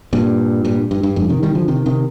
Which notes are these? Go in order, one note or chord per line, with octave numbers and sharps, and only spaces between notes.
G2 A#2
G2 A#2
G2
G2
F2 G#2
C3 D#3
D#3 G3
D3 F3
C3 D#3
C3 D#3